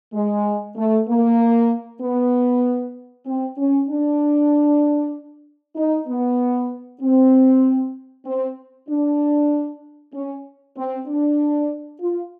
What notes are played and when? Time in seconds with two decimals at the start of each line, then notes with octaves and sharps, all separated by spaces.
0.14 G#3
0.77 A3
1.09 A#3
2.02 B3
3.26 C4
3.58 C#4
3.90 D4
5.76 D#4
6.08 B3
7.02 C4
8.26 C4
8.89 D4
10.14 C#4
10.77 C4
11.08 D4
12.01 F4